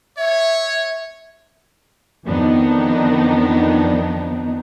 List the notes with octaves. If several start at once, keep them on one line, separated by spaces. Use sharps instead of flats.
C#5 E5
F2 D#3 B3 D4 D#4